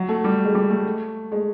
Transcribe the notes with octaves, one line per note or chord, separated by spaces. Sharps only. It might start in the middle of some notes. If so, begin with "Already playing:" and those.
Already playing: F#3
A3
G3
G#3
G3
A3
G#3